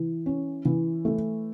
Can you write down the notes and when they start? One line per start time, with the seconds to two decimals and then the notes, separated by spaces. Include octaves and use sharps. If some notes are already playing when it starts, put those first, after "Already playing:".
Already playing: E3
0.26 C#4
0.65 E3
1.05 A3